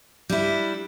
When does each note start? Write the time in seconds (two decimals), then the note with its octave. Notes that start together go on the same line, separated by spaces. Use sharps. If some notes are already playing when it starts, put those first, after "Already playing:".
0.29 G3 D4 E4